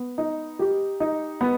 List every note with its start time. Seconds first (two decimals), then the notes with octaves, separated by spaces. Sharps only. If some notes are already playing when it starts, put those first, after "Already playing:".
Already playing: B3
0.18 D#4
0.59 G4
1.00 D#4
1.41 B3